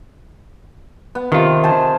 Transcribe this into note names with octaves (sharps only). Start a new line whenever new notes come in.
B3
C3 D#3 F4
C5 G#5 A5